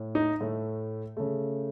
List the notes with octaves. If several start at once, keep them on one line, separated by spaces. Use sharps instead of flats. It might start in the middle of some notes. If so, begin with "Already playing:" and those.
Already playing: A2
D#4
A2 A3
C#3 A3